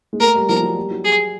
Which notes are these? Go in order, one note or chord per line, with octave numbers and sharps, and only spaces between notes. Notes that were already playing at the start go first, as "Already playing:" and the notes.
G#3
A3 A#4
G3
F3 A#4
F#3
G3
F#3
G#4